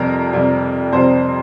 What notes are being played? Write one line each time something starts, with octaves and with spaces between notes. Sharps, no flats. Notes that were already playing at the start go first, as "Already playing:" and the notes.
Already playing: F2 C3 G3 A#4
F2 C3 G3
F2 C3 G3 C5